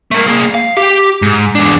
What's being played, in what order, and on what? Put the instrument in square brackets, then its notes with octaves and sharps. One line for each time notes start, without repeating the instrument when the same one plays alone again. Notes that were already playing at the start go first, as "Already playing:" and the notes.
[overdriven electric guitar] A3 A#3
A#3 G#4
F5
G4
G#2
E2 D4